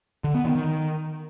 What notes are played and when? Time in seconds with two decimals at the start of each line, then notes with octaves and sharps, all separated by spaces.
0.24 D3
0.34 B3
0.45 D#3
0.55 D#3